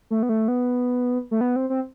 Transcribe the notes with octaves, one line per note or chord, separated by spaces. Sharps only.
A3
B3
A3
B3
A3
B3
C4
C4